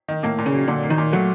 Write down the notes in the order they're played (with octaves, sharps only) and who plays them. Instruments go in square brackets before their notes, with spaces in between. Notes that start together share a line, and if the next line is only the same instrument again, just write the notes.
[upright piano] D#3
[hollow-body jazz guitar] A2 [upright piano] A#3
[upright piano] A#2
[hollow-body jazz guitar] C#3
[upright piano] F#3
[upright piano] A#2 [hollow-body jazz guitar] D3
[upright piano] A#3
[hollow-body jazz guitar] D#3
[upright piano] A#2
[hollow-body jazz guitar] F#3 [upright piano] A3